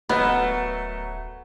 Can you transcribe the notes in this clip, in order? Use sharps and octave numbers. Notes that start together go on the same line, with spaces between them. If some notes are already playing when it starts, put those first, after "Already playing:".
D1 F#3 A3 B3 A#4 B4 D#5 B5